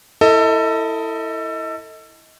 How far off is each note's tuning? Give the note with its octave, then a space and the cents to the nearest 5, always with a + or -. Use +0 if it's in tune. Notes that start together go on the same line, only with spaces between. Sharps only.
E4 +0 A4 +25 D#5 +25